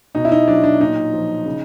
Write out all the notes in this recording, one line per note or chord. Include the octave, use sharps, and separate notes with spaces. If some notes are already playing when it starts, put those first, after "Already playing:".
B2 D#4
E4
D#4
F#3 D4
D4
A#2 D#4
F3
C#3